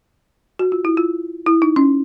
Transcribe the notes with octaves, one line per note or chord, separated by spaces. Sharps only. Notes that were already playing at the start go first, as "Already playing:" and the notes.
F#4
F4
E4
F4
E4
D#4
C#4